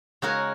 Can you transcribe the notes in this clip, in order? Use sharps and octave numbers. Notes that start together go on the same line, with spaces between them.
C#3 G#3 F#4 A#4 C#5